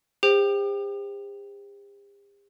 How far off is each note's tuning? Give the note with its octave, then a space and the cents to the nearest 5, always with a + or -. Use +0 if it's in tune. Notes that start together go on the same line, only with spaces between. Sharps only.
G4 +45 C5 +0 G5 +0